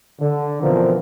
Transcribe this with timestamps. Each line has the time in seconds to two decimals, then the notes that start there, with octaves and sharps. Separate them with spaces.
0.21 D3
0.63 B2 D3 E3 F3 C4 A#4